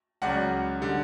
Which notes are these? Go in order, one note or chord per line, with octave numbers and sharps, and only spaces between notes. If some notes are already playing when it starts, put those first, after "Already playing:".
C#2 C#3 F#3 D5 F#5
D3 G3